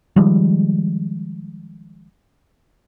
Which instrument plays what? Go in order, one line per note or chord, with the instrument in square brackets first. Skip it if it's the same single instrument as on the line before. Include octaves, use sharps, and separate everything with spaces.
[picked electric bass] D#3 F3 G3 G#3